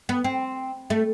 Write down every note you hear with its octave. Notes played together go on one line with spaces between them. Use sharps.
B3
C4
A3